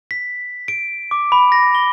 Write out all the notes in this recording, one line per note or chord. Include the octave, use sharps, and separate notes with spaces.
B6
D7
D6
B5
A#6
G7